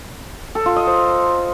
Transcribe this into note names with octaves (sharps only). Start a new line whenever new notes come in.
A4
F4
D#5
C5